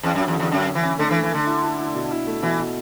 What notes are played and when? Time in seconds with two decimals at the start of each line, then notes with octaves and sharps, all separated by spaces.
0.03 E2 C#4
0.15 F#2
0.20 F#3
0.28 E2
0.34 D3
0.39 E2
0.51 F#2 C#4
0.67 C#4
0.75 E3
0.83 C#4
0.98 D3 A3
1.11 E3
1.14 A3
1.23 E3
1.31 D3 A3
1.46 E4
1.63 E4
1.78 E4
1.94 B2
2.11 E4
2.27 A3
2.42 B2 E3
2.59 B2